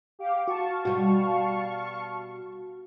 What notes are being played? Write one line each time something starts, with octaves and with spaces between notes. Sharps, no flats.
G4 F5 D6
F#4 F5 A5 C#6
B2 G3 F#4 B4